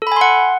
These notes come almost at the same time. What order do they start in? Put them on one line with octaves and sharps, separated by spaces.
A4 B5 G#5 C6 F#5